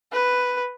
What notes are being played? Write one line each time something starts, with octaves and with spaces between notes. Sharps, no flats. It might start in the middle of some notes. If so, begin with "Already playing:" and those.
B4